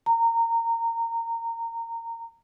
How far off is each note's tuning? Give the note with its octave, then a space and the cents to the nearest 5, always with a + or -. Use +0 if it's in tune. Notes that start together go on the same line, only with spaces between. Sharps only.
A#5 -20